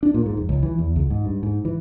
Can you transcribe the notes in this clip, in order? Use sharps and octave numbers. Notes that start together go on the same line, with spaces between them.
D4
A#2
G#2
F1
C#2
E3
E2
C#2
G#2
G2
G#2
E3